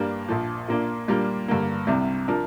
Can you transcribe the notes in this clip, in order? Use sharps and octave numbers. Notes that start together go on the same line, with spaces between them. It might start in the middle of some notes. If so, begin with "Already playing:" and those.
Already playing: G2 G3 A#3 D4
A#1 A#2 F3
A#2 A#3 D4
A#2 G3 A#3 D4
G2 D3 A#3
C2 C3 G3
F3 D4 A#4